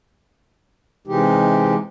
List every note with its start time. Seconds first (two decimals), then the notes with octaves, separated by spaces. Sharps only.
1.07 C3 E3 G#3 D#4 G4